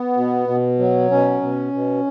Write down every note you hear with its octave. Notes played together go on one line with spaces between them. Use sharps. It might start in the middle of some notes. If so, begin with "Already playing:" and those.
Already playing: B3
B2
B2
F#3
B2 C#4
B2
B2